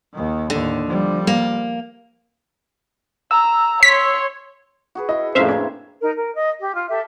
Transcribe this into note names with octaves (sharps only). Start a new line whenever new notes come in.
D#2 D#3
D#2 A2 D3
F3 G3
A#3
A#5 E6
C#5 C6 B6
F#4 G#4 B4
E4 F#4 D#5
F2 A2 C#3 E3 A#3 C5 E5 F5
C4 D4 C5 G#6
D#4 A#4
A#4
D#5
G4
F4
G4 A4 E5